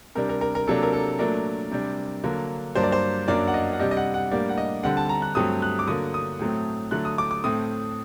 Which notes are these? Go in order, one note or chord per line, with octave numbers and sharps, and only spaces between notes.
C3 G3 D4 A#4
A#4
A#4
A#4
C3 F#3 A#3 D4 A4
A#4
A4
A#2 F#3 A3 D4 A#4
C3 G3 D4
D3 F#3 A#3
G2 F#3 A#3 D4 C5
D5
C5
F#2 F#3 A#3 D4 D5
F#5
D#5
F#5
C3 G3 D4 D#5
D#5
F#5
F#5
A2 G3 A#3 D4 D5
F#5
D#5
D3 G3 C4 F#5
A5
A#5
F#6
G2 F#3 A3 C4 D#6
F#6
D6
D3 F#3 A#3 D#6
D#6
A2 F#3 A3 C4
D3 F#3 A3 F#6
D#6
D6
D6
A2 A3 C4 D#6